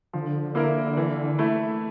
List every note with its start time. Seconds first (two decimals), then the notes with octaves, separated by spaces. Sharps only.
0.13 D3 F3
0.55 A#3 E4 A#4
0.97 E3
1.39 A3 E4